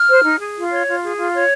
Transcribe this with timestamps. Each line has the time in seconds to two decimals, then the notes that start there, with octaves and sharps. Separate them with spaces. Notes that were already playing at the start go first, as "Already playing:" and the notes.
Already playing: F6
0.09 C5
0.24 D#4
0.39 G#4
0.55 F4
0.71 C#5
0.87 F4
1.03 G#4
1.17 F4
1.34 C#5